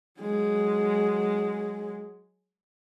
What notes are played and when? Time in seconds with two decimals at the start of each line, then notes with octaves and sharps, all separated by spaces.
0.20 F#3 G#3